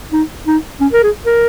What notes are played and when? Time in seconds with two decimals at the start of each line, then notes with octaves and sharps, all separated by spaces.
0.13 D#4
0.47 D#4
0.81 C#4
0.93 A#4
1.03 G#4
1.26 A#4